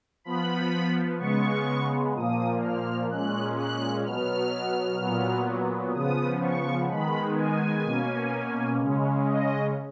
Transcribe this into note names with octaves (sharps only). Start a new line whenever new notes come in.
F3 B3 B5
C#3 G#3 B3 C#6
A#2 F3 A#3 D#6
F6
A#2 G#3 C#4 F#6
F#6
B2 F#3 B3 F6
A#2 F#3 B3
C#3 F3 B3 D#6
C#6
D#3 G#3 B3 B5
G#5
B2 A#3 C#4
C#3 G#3 C#4
D#5